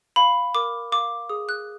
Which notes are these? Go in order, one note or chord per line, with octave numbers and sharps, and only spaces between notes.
F5 B5
A#4 D6
F5 D6
G#4 D#6
F#6